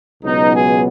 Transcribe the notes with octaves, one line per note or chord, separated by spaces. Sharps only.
C#2 B2 F#3 B3 D#4
G#4